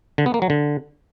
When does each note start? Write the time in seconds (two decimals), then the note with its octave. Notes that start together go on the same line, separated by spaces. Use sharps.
0.18 D3
0.26 B3
0.34 A#3
0.42 F#3
0.50 D3